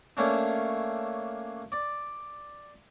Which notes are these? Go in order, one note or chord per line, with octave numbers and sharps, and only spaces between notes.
A3 A#3 C#4 D4
D5